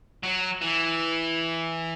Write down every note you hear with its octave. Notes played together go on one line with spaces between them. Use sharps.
F#3
E3